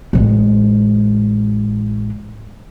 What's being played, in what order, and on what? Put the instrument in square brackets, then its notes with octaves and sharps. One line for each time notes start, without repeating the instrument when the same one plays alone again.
[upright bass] A1 G#3